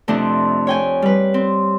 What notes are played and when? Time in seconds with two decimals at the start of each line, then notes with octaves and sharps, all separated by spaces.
0.08 F2 C3 A3 C4 D4
0.67 C#5 G5 G#5
1.02 G3 B4
1.34 C4